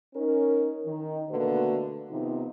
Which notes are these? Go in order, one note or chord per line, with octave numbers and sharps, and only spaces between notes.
C#4 D#4 A#4
D#3
B2 D3 A3 A#3 F#4 B4
C3 D#3 F3 B3 D#4